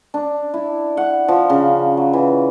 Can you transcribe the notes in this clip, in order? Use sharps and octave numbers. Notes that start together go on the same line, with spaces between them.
D4
E4
F#5
F3
C#3
F#3
E3